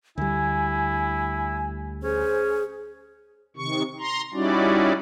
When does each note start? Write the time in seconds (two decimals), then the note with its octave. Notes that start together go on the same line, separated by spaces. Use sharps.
0.18 D2 G3 E4 G#5
2.03 C#4 G#4 C5
3.57 C3 D#3 C#6
3.99 A#5 C6
4.34 G3 C#4 D#4 E4 F#4 D5